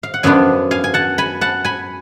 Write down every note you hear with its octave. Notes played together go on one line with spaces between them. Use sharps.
F5
F#5
F#2 F3 B3 D4 F5 G#5
F5 G#5
G#5
F#5 A5
G#5 B5
F#5 A5
G#5 B5